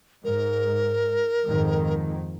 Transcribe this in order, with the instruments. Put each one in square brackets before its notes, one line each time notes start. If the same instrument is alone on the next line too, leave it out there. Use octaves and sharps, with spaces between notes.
[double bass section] G#2 [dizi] A#4
[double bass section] F2 G#2 D#3